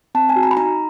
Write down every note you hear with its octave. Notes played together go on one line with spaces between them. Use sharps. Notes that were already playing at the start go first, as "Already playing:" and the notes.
C4 A5
G#5
F#4
A#5
B5
D#4 A#5